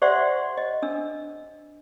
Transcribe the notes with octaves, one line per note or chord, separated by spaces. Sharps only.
G4 C5 D5 E5 F#5 C6
D#5
D4 E6